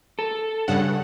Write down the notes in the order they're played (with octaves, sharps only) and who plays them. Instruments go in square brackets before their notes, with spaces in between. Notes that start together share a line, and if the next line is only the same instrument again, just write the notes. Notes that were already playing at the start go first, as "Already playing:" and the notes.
[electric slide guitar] A4
[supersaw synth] G2 C#3 F#5